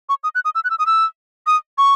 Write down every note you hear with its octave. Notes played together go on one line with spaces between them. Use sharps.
C#6
D#6
F#6
D#6
E6
F#6
E6
D#6
E6
D#6
C#6